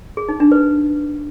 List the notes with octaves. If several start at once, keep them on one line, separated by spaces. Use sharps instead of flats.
G#4
D#4
D4
B4